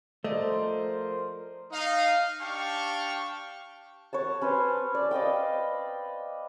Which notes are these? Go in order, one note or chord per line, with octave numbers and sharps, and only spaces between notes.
F3 A3 A#4 C5 D5 D#5
D#4 F5
D4 G4 F5 G5 A5 C#6
C#5 F#5 A5
C#4 B4 C5 C6
D5
D5 D#5 F5 G5